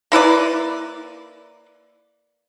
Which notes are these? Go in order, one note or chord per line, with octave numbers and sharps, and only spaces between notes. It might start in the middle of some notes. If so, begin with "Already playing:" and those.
A#3 E4 B4 D5